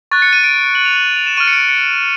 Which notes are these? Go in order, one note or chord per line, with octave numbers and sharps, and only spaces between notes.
C#6 F#6 A6
C#7
D#7
D7
F#7
F7
F#7
F#7
F7
E7
C#6 F6 D#7
C#7
D7
C#7